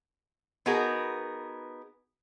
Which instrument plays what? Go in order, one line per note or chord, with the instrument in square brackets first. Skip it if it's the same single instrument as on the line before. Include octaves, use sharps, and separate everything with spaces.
[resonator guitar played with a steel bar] B3 D#4 F#4 G#4 A#4